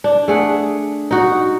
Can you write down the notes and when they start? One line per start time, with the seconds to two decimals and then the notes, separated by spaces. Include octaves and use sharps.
0.04 D4
0.28 A3 G#4 F#5
1.11 D#4 F#4